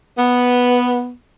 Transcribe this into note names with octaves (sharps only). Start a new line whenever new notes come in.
B3